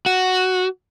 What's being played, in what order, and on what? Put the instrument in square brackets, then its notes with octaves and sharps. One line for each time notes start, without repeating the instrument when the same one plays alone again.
[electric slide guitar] F#4